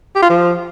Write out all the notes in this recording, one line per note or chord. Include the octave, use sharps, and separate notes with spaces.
G4
F4
F3